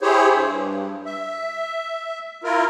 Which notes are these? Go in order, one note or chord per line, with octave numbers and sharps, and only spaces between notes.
E4 G4 G#4 C5 C#5
G2
E5
E4 F4 A#4